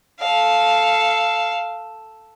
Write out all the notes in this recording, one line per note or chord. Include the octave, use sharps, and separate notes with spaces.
A4 F5